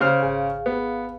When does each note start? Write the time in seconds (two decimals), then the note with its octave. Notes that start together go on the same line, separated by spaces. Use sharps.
0.01 C#3 C5 F6
0.21 G#1 G#4 F5
0.66 B3